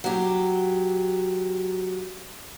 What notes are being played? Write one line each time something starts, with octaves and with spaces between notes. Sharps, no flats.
F#3 G4